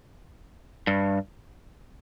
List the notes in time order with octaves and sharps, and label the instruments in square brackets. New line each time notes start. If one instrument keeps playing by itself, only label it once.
[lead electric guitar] G2